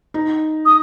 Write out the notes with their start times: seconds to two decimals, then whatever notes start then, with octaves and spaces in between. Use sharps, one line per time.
0.14 D#4
0.65 D#6